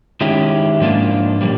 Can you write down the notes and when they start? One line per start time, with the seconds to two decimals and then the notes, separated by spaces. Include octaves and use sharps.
0.21 D#3 G#3 C#4 E4 G4
0.80 G#2 F3 A#3 D4 F4
1.41 A#2 G3 A#3